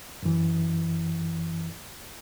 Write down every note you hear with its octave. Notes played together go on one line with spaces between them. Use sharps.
F#2 E3